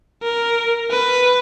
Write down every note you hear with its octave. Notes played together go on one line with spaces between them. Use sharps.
A#4
B4